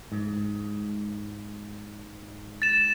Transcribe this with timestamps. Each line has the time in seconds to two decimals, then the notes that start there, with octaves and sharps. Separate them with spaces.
0.12 G#2
2.62 A6 E7